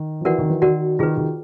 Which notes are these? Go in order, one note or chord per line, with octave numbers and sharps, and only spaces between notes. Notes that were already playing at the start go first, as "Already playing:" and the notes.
Already playing: D#3
F3
E3 F#4 A#4 D5 F#5
D#3
E3
D#3 F#4 A#4 D5 F#5
D#3 F4 G#4 B4
D#3